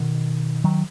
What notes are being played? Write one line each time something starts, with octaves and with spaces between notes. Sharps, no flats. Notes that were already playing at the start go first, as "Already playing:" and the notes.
Already playing: B2 D#3
D#3 F#3